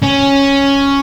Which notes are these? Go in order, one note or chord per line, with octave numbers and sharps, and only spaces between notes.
C#4